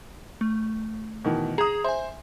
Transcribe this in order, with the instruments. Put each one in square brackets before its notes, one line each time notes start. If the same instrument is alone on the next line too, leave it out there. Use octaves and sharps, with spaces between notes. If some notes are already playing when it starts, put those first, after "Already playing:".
[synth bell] A3
[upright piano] B2 D#3 E3
[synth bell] G#4 G#6 [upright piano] A#5 D#6
[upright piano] C5 [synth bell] E5 G#5